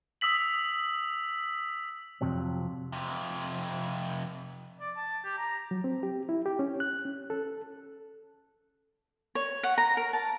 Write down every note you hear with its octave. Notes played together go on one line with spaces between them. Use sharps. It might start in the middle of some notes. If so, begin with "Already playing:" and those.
D#6 E6 B6 F#7
F2 A2 C3 F#3 C4
F2 C3
D5
A5
G4
A#5
F#3
C4
G4
E4
G4
C#4
F#6
C#4
A4
C#5
F#5
A#5
A#4
A5